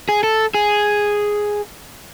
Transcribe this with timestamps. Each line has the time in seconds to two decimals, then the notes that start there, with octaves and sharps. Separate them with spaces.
0.09 G#4
0.23 A4
0.54 G#4